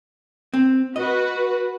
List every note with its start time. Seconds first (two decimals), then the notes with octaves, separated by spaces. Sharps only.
0.54 C4
0.96 F#4 B4 D#5